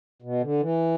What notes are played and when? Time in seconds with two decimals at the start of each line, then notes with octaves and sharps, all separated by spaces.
0.22 B2
0.42 D3
0.60 E3